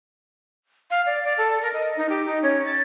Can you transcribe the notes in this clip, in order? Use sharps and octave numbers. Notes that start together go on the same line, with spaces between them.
F5
D5
D5
A4
A#4
D#5
D#4
G4
D#4
C#4
A6